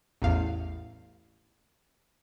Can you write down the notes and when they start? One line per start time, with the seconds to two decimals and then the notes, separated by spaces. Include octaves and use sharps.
0.22 A1 E2 F5